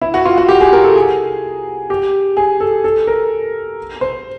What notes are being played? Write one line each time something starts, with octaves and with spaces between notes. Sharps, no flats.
E4
F#4
F4
F#4
G4
G#4
A#4
A4
G#4
G4
G#4
A4
A4
A#4
C5